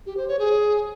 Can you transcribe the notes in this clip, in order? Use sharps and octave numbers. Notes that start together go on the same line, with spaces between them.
G4
C5
C#5
G#4